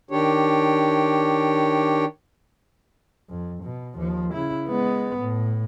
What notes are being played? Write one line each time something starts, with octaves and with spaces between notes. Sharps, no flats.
D#3 D4 G4 C#5
F2
B2
D#2 F3
C#3 E4
G#3 B3
A2